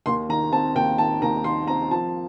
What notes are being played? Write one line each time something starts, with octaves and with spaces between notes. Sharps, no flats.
D#2 C6
D#3 A#5
C4 A5
D#2 G5
D#3 A5
D#2 A#5
D#3 C6
C4 A#5
F3 A5